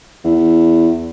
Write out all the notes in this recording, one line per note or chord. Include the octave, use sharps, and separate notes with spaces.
E2